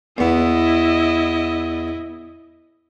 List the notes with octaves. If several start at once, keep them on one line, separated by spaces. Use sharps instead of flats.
E2 B3 E4 D#5